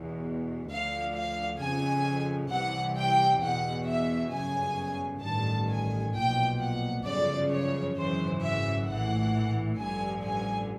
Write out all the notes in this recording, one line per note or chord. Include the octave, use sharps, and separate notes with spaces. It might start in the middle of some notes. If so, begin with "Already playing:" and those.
Already playing: E2 B2
D2 D3 F3 F5
F5
F2 C#3 F3 G#5
C2 C3 E3 F#5
G5
E2 B2 F#5
E5
G1 F#2 C#3 G#5
A1 G2 D#3 A5
G#5
B1 A#2 F3 G5
F#5
G1 F#2 C#3 F3 D5
C#5
G#1 F#2 C#3 E3 C5
E5
A#1 A2 E3 F#5
A1 G2 D3 F3 G#5
G#5